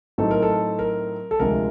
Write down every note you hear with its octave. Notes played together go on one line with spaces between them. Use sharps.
A2 F#3 A3 C4 D#4 A4
A#4
A4
A#4
A4
D2 C3 F3 G#3 A#4